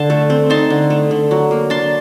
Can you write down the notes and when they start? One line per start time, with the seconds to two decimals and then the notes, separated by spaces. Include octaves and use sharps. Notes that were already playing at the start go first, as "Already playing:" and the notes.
Already playing: D3 A5 C6
0.10 A3
0.30 C4
0.50 D#4 A5 C6
0.70 D3
0.90 A3
1.11 D3
1.31 F#3
1.51 A#3
1.70 D4 A5 C6